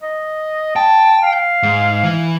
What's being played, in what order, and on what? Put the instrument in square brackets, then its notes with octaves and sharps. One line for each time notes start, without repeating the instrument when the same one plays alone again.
[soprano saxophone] D#5
[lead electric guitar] G5 [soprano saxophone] A5
[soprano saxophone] F5
[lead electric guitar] G#2
E3